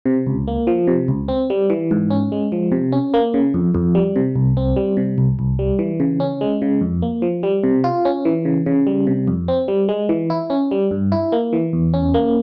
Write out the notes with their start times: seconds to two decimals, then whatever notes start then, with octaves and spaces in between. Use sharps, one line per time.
0.06 C3
0.27 C#2
0.48 A#3
0.67 F3
0.87 C3
1.08 C#2
1.28 C4
1.50 G3
1.70 E3
1.91 G#2
2.10 C#4
2.32 G#3
2.52 F3
2.72 C3
2.92 C#4
3.14 A#3
3.34 C#3
3.54 F2
3.75 F2
3.95 G3
4.16 C3
4.36 C2
4.57 C4
4.76 G3
4.97 C3
5.18 C2
5.39 C2
5.59 G3
5.79 E3
6.00 C#3
6.20 C#4
6.41 G#3
6.62 C#3
6.81 F2
7.02 A#3
7.22 F3
7.43 G3
7.63 C3
7.84 F4
8.05 C#4
8.25 E3
8.45 C#3
8.66 C#3
8.87 G3
9.07 C3
9.28 F2
9.48 C4
9.68 G3
9.89 G#3
10.09 E3
10.30 E4
10.50 C#4
10.71 G3
10.91 G2
11.12 E4
11.32 A#3
11.53 E3
11.73 E2
11.94 C#4
12.14 A#3